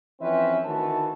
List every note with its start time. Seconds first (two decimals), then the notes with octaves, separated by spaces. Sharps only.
0.21 F2 E3 C4 C#4 B4 E5
0.65 D2 D#3 E3 F#4 B4 A5